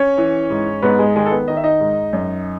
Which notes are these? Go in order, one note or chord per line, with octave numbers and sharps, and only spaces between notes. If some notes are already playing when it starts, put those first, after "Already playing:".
Already playing: C#4 C#5
E3
G#2
G#2 B3 B4
G#3 G#4
D#3 G#3 G#4
A4
B3 B4
D#3 D#5
E5
D#4 D#5
G#2
F#2